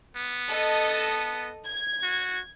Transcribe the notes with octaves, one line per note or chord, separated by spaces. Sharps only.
B3
A4 D#5
G#6
F#4